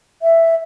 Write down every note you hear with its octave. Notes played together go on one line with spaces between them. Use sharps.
E5